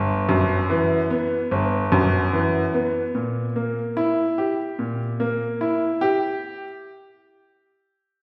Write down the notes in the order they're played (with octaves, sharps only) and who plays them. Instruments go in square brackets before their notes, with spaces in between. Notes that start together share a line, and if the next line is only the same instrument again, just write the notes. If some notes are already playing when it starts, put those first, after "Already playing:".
Already playing: [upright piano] G1
F#2
E3
B3
G1
F#2
E3
B3
A#2
A#3
E4
G4
A#2
A#3
E4
G4